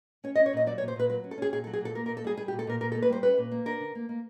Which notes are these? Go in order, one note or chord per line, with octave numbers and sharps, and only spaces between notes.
C#4 C#5
D#5
C#4
C#5
A#2 D#5
F#3 D5
C#5
A#2
C5
A#2 B4
F#3 B4
C#4
A4
C#4 G#4
A#2 G#4
A4
F#3
G#4
A#2 A4
A#3 A#4
A#4
A#2
A4
G3 G#4
G3 G#4
G4
A#2
A4
A#2 A#4
A#2 A#4
A4
A#3
B4
G3 C5
C#4 B4
A#2
A#3
D4 A#4
D3
A#3
A#3